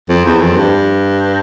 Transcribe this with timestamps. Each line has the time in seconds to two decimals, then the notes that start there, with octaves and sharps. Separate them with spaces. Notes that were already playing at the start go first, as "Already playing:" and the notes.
0.09 F2
0.25 E2
0.41 F2
0.57 G2